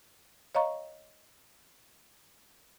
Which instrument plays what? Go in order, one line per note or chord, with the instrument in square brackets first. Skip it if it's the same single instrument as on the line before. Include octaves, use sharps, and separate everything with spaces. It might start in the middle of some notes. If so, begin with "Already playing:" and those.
[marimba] C#5 D#5 F5 A#5 C#6